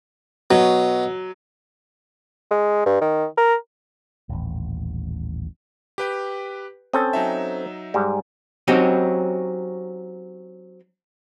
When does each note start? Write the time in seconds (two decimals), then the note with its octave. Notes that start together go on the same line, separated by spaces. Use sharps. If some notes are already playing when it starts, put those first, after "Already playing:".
0.51 B2 F#3
2.51 G#3
2.86 G2
3.01 D#3
3.37 A#4
4.29 D#1 A1
5.98 G4 B4 G5
6.93 C4 C#4 A4 D#6 G6 A6
7.13 F#3 D#4 E5
7.94 G#2 G3
8.68 F#3 C4 C#4 D#4 G4